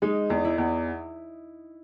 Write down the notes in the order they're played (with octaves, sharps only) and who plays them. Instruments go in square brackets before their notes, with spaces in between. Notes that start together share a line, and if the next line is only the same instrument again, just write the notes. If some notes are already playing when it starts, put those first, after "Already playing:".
[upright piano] G#3 [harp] D#4
[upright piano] E2
[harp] E4
[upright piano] E2